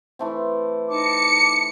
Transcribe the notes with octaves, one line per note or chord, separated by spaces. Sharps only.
E3 A3 C4
D#4 A5 D6 C#7